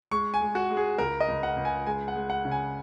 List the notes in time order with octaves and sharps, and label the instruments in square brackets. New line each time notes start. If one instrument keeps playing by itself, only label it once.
[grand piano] G#3 C#6
G#5
G#3
F#4
G#3
G#4
C#2 A#4
D#5
C#2
F#5
C#2
G#5
G#3 G#5
F#5
G#3
F#5
C#3
G#5